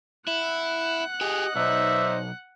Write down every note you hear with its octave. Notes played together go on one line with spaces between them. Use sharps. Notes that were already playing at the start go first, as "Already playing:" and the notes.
E4 F#5 F#6
G4 G#4 D#5
B1 D#4 C5 D5 E5